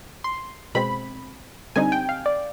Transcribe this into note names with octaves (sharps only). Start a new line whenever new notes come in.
C6
B2 G#3 C4 B5
D3 G3 C4 D#4 G#5
G5
F5
D5